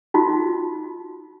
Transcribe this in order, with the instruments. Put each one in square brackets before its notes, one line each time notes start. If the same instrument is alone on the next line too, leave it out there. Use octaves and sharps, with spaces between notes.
[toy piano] D#4 F4 F#4